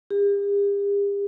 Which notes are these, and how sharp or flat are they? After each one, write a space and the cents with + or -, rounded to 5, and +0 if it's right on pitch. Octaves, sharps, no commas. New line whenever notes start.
G4 +45